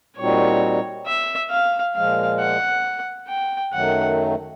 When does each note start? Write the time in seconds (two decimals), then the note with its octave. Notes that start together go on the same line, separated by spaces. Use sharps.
0.17 A#2 G3 C4 D#4 F#4 C#5
1.07 E5
1.51 F5
1.95 A#2 F3 G#3 F5
2.39 F#5
3.28 G5
3.72 F#2 D#3 F#3 A3 F#5